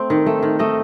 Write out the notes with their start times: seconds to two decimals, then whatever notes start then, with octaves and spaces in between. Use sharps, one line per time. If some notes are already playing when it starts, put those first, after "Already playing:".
Already playing: A3 C4 C5
0.10 D#3
0.26 A3
0.43 D#3
0.59 A3 D#5